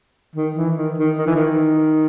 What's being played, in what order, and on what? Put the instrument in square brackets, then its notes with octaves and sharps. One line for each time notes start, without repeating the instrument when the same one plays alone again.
[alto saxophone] D#3
E3
D#3
D#3
D#3
E3
D#3